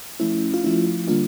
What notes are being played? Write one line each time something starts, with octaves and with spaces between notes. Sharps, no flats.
F3 A3 C#4 E4
F4
F3 A3 C#4 E4
D3 G3 A#3 D4 F4